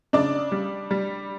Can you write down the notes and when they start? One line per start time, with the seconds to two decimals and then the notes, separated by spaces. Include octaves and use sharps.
0.13 C#3 D4 D5
0.52 G3
0.91 G3